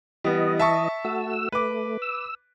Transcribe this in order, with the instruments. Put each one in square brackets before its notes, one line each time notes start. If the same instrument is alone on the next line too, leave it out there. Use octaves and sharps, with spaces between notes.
[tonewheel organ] E3 D#5 [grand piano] G3 B3
[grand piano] E5 A5 C#6
[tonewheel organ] A3 F#4 E6
[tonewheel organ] A3 [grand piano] B4 D6
[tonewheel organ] E6